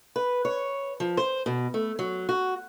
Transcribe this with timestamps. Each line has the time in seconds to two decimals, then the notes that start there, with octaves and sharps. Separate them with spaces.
0.16 B4
0.45 C#5
1.00 F3
1.17 C5
1.46 B2
1.74 A3
1.99 F#3
2.29 F#4